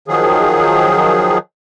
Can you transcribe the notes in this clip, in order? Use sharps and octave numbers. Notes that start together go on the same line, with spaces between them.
D#3 F3 F#3 G#4